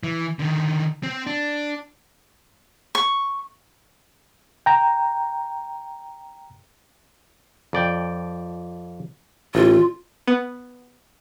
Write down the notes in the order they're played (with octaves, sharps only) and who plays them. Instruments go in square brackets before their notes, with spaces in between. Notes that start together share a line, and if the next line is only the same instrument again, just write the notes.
[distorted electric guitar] E3
D3 D#3
C4
D4
[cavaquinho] C#6
[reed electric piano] G5 A#5
[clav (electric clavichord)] F2 D5 G5
[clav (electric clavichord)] A1 [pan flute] F4
[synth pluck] B3